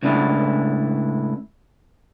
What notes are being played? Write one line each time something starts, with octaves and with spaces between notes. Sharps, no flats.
C#2 A2 C#3 D4 E4